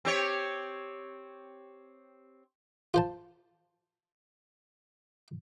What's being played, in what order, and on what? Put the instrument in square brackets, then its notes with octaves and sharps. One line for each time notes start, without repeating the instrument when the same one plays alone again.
[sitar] C4 G4 C#5
[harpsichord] F4 C5 A5